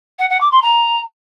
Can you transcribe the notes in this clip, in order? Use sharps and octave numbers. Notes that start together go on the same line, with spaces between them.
F#5
F#5
D6
C6
A#5